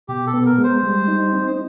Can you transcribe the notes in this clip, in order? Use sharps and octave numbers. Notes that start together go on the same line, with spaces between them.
B2 G4
A4
B3
A#4
G#3
C5
G3
D#4
C4